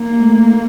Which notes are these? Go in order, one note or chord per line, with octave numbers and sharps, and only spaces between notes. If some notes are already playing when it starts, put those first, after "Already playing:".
Already playing: A#3
A3